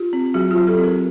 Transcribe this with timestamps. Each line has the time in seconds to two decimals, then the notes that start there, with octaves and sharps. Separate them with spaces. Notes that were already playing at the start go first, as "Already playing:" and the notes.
Already playing: F4 G4
0.13 C4
0.34 F#3 F#4 G#4
0.51 F4 G4
0.56 F#3
0.67 G4 A4
0.78 C4
0.83 G#4 A#4